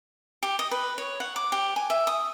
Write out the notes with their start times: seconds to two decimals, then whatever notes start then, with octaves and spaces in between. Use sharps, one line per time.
0.43 G4
0.59 D#5
0.71 B4
0.98 C#5
1.20 F#5
1.36 D6
1.52 G4
1.76 G#5
1.90 E5
2.07 D#6